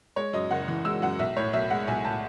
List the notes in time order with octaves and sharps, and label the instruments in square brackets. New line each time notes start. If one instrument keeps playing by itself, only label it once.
[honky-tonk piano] G#3 C#5
F#2 D#5
F#1 F#5
E3
G#3 E6
F#2 F#5
B1 E5
A2 C#5
B1 E5
G#3 F#5
B1 G#5
A2 A5